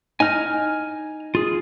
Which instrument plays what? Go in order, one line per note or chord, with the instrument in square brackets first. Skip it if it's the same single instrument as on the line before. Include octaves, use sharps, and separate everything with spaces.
[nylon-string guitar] D#4 [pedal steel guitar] G#5 F6
[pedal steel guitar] F4 G#4